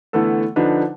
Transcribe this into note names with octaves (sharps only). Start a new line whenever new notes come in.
D3 E3 A3 B3 A4
D3 F3 D4 D#4 B4